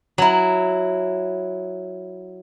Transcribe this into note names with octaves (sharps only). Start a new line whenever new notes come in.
F#3 E4